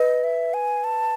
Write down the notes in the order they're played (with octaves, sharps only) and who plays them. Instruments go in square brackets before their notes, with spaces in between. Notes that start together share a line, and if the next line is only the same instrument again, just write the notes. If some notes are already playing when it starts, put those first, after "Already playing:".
Already playing: [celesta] B4 [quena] D#5
[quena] E5
G#5
A5